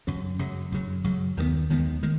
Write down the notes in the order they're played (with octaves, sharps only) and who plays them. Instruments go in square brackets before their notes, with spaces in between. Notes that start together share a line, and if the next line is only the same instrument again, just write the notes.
[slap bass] F#2 C#3 F#3
F#2 C#3 F#3
F#2 C#3 F#3
F#2 C#3 F#3
D#2 D#3 G#3 B3
D#2 D#3 G#3 B3
D#3 G#3